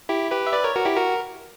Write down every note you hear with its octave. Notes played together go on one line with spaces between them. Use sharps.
E4 G4
G4 B4
E5
B4 D5
A#4 C#5
F#4 A#4
E4 G4
F#4 A#4